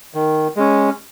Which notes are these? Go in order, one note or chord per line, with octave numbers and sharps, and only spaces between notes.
D#3
G#3 C#4